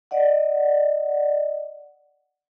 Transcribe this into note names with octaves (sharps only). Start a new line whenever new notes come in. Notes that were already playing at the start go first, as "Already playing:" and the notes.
D5 D#5 F#5